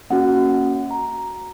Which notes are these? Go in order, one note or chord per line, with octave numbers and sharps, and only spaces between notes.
A#3 C#4 F#4 F#5
A#5